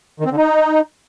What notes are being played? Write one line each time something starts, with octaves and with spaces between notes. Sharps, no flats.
D#3
C4
D3
D#4